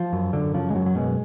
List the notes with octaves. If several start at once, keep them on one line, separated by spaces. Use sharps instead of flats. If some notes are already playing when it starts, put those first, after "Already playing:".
Already playing: F3
F#2
F#2 D3
C#3 F3
G#3
F#2 F#3
F#3
B2 G#3